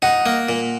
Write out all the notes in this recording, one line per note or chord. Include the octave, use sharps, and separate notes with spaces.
D#4 F#5
A#3
A#2